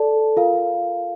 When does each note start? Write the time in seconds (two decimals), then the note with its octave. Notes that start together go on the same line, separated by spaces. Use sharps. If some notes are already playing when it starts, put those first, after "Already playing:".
Already playing: A4 D5 A5
0.37 F4 A#4 F5